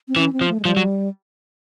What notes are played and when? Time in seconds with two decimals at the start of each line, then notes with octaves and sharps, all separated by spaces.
0.08 C4
0.16 E3 C#4
0.33 C4
0.41 F3
0.49 A3
0.60 G#3
0.65 F3 G3
0.77 F#3